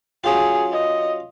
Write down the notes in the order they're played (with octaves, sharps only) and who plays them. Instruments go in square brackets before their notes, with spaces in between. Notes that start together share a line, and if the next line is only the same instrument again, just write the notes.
[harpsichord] F#3 C#4 F4 [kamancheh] G#4
[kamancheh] D#5